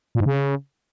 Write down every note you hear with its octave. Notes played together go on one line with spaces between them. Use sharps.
A#2
G#2
C#3